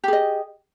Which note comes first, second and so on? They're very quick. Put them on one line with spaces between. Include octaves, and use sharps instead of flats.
G4 G#4 D#5